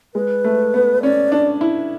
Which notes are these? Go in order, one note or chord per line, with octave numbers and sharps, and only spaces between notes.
G#3 B4
A3
B3
C#4 D5
D4
E4